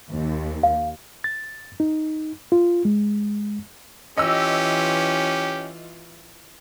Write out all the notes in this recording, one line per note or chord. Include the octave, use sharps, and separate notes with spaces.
D#2
F5
A6
D#4
F4
G#3
E3 C#4 F4 G4 D#5 E6